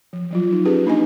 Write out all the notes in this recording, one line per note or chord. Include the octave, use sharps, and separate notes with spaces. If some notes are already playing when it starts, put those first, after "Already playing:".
F3
F3 F#3 F4
D#4
C#4 F4 G4 G#4 B4
A#3 D4 D#4 D#5 G#5